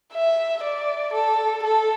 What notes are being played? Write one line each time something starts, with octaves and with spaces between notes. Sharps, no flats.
E5
D5
A4
A4